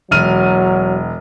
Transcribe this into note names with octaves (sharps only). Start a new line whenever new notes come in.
E1 F#3 F6 D#7